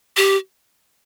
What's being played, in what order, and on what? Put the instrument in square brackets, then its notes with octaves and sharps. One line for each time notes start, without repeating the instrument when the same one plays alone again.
[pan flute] G4